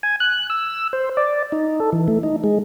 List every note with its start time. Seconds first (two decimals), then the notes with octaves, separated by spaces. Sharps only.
0.03 G#5
0.20 F#6
0.50 E6
0.93 C5
1.17 D5
1.52 D#4
1.80 A4
1.92 E3
2.08 A3
2.23 D#4
2.44 G#3